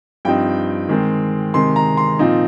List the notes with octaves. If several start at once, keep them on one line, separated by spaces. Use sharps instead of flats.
G2 F3 C4 D#4 G5
D#3 G#3 C4
C3 D#3 G#3 C6
A#5
C6
A#2 F3 C4 D#4